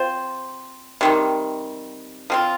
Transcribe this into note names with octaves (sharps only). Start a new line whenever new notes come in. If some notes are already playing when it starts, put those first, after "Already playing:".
Already playing: C4 F4 C5
C3 D#3 G3
F3 C4 F4